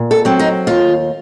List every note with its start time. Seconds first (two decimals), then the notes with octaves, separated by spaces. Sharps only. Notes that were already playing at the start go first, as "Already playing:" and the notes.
Already playing: A#2
0.11 A4
0.25 F#3 C4
0.40 D#4
0.67 D#2 F4